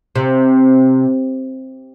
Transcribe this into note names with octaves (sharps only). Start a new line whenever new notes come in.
C3